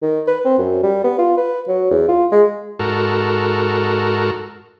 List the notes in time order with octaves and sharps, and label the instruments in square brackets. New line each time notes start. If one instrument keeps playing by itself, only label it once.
[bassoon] D#3
B4
C4
F#2
G3
B3
F4
B4
F#3
E2
F4
G#3
[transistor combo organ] G#2 F#4 A4 A#4